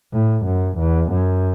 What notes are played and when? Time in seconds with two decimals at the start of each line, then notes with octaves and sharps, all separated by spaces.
0.13 A2
0.46 F#2
0.79 E2
1.12 F#2